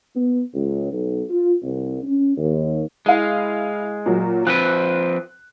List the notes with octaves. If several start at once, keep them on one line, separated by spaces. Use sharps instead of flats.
B3
C#2
B1
F4
C2
C#4
D#2
G#3 E4 F5
A#2 F#3
F3 C4 B4 F#6